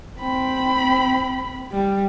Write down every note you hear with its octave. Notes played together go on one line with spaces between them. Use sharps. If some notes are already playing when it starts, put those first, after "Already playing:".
C4 B5
G3